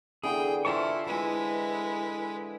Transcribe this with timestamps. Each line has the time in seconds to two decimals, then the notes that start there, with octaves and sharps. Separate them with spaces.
0.23 D3 E3 B3 G#4 G5
0.65 E4 F4 C5 E5 G5 A5 C#6
1.07 G#3 E4 B4